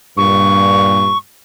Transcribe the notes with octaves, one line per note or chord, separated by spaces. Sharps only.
G2 A#2 C#6